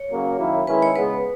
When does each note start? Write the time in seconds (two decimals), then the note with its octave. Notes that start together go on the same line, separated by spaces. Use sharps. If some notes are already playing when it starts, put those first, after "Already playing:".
Already playing: C#5
0.10 F#2 C#3 F#3 A#3
0.38 F#2 D#3 A#3 E4
0.67 D#3 G#3 C#4 E4 B4
0.82 C#5
0.96 C#3 G#3 B3 B4